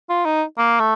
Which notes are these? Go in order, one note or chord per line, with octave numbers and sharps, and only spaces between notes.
F4
D#4
A#3
A3